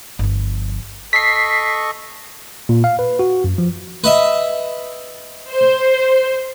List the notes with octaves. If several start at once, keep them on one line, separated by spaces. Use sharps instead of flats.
G1 F3
A4 D#5 C#6 B6 C7
A#2
F5
B4
F#4
F#2
F3
B4 D#5 E5
C5